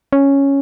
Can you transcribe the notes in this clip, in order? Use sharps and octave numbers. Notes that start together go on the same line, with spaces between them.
C#4